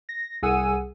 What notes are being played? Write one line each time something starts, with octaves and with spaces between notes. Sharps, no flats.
A#6
C2 G#4 F#5 G#5 E6 D#7